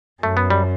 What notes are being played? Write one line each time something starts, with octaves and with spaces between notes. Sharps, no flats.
F#2 A3
B3
G3